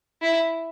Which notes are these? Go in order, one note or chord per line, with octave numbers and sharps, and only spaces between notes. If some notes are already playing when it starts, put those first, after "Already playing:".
E4